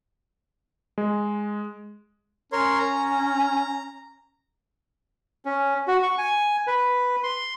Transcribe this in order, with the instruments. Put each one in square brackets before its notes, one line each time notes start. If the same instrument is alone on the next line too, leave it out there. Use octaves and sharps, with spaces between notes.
[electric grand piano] G#3
[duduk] C#4 [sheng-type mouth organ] A#4 C#5 C6
[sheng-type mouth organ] A#5
[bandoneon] C#4
F#4
C#6
G#5
B4
C6